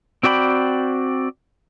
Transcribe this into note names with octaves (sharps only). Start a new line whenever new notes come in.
C4 F#4 D5 G5 B5